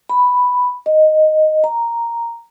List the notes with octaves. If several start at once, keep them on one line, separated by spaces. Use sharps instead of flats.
B5
D#5
A#5